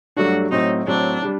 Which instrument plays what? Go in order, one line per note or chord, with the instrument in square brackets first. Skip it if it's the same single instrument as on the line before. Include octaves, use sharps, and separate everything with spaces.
[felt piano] G2 F#3 A3 D4 [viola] F#4
[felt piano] A2 F#3 C4 [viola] D#4
[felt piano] A2 F#3 C4 [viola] D4
[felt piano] G3 D4